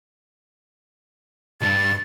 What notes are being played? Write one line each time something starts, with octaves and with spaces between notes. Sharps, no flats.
B1 G2 A6